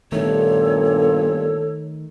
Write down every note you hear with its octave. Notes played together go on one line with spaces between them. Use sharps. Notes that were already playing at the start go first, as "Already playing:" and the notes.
G1 A#2 D#3 A3 A4 C#5